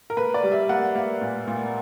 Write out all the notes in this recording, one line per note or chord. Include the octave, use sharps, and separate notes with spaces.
A#4
A#3 B4
D5
G3
E5
A#3 F#5
A#3
A#2
A#2